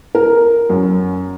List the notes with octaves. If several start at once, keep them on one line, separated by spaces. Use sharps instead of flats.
A#4
F#2